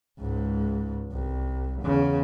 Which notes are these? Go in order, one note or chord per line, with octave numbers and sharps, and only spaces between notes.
C#2 G#2
C2
E2 C#3